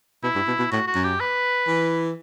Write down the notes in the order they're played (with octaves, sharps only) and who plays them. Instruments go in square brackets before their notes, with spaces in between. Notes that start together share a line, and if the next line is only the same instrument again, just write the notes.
[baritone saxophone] B2 [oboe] E4
[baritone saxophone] G2
B2
B2
[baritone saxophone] A2 [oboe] F#4
[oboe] F#4
[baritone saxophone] F#2
[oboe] G4
B4
[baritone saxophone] E3